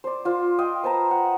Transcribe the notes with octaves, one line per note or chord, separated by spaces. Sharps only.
C5 D5
F4 C5
D#5 F5 G5
B4 C5 A5 A#5
F#5